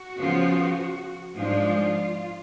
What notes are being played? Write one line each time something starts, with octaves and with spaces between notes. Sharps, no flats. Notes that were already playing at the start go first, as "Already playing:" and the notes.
Already playing: F#4
C#3 F3 B3 F4
G#2 F3 G#3 D4 F4